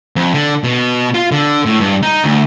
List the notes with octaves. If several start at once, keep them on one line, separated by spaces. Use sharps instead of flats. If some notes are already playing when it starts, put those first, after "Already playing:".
F2
D3
B2
F4
D3
A2
G2
D#4
D2